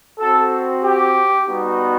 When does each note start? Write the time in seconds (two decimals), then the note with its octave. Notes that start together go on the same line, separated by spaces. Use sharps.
0.19 C4 F#4 A4
0.83 G4
1.47 G3 B3 D#4 F#4